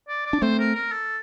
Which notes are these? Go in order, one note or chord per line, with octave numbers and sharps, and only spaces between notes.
D5
D5
D4
A3 C4 C5
A#4
A#4
A4